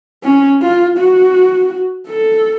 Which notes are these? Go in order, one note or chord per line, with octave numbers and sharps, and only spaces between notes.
C#4
F4
F#4
A4